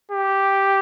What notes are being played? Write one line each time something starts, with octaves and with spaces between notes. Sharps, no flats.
G4